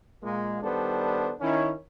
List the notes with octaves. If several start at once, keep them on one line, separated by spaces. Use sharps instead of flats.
A#2 G#3 A#3
D#3 G3 B3 D4 A4 C5
D#3 C#4 E4